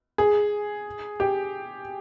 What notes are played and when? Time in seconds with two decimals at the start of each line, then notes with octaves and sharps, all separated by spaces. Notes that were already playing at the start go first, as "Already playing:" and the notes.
0.18 G#4
1.20 G4